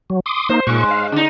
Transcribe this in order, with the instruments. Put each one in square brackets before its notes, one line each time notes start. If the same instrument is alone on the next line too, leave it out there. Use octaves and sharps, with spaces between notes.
[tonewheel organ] F#3
C6 D6 D#6
[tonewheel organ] A#3 D#4 [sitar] C5
[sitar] G2 G#3 [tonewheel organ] A#2 C#6
[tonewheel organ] F5
[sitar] D3 D#4 [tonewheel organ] D4